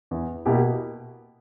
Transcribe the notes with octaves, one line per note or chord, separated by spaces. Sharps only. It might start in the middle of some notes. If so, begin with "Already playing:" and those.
E2
B2 A#3 E4 G4